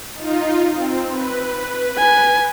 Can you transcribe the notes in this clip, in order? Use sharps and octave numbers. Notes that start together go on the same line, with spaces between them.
D#4 F4
C4
B4
G#5